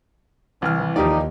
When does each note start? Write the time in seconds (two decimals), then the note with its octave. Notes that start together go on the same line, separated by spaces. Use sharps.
0.62 C2 E3 F6
0.96 D#2 F3 G3 A#3 D#4 G4 D5 D#5